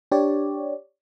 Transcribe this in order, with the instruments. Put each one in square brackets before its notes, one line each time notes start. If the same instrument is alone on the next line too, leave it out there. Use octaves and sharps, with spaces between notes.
[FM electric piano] D4 G4 C#5 D5